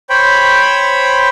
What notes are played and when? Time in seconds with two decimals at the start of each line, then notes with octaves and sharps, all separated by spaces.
0.10 C5 C#5 G5 B5